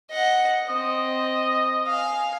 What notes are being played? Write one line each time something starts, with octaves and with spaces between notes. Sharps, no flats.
D#5 F#5
C4 D#5
F5 G#5